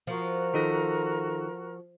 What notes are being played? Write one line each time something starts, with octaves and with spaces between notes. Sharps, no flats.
F3 F#4 A#4
D#3 D#4 F4 A4 A#6